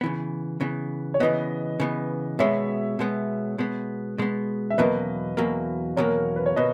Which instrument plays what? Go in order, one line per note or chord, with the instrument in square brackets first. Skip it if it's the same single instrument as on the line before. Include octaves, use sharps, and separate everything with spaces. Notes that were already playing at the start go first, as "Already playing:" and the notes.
[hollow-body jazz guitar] C#3 E3 B3
C#3 E3 B3
[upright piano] C#5
[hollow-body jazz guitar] C#3 E3 B3 [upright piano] B4 D#5
[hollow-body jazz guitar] C#3 E3 B3
[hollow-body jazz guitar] B2 G#3 B3 [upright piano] C#5 E5
[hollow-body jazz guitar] B2 G#3 B3
B2 G#3 B3
B2 G#3 B3
[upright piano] E5
[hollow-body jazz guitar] E2 B2 F#3 A#3 [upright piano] B4 D#5
[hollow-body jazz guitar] E2 B2 F#3 A#3
[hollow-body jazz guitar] E2 B2 F#3 A#3 [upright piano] A#4 C#5
[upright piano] B4
C#5
[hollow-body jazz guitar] B2 [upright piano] B4 D#5